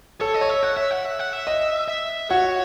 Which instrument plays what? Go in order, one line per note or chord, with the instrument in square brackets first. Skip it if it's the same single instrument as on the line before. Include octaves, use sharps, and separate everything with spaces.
[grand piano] A4 [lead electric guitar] C#5
[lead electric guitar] D#5
[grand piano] C#5
[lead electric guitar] E5
[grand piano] C#5 [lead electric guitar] F#5
[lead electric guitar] E5
F#5
E5
F#5
E5
[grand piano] D#5
[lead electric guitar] E5
[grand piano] F#4 [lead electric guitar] C#5